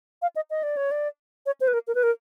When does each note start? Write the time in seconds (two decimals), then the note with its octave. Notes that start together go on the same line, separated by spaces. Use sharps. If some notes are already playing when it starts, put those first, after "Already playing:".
0.22 F5
0.36 D#5
0.50 D#5
0.63 D5
0.77 C#5
0.91 D5
1.46 C#5
1.61 C5
1.68 B4
1.73 A#4
1.87 A#4
1.95 B4
2.03 A#4